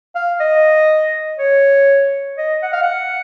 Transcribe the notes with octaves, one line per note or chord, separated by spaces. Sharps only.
F5
D#5
C#5
D#5
F#5
F5
F#5